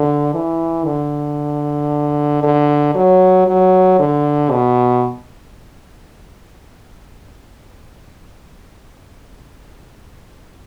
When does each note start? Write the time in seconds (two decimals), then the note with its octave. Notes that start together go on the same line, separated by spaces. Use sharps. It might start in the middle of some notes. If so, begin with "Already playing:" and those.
Already playing: D3
0.34 E3
0.85 D3
2.43 D3
2.95 F#3
3.47 F#3
3.99 D3
4.51 B2